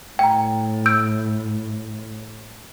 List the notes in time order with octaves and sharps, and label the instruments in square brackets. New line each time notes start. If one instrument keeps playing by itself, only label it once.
[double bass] A2 [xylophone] G5 A#5
[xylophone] E6 G6 D7